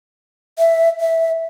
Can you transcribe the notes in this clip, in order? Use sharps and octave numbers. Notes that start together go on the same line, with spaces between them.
E5
E5